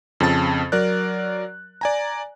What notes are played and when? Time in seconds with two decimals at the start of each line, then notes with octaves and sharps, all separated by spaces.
0.20 F2 C#3 C4 A5 A6
0.72 F#3 A#4 D5 F#6
1.81 D5 G#5 A#5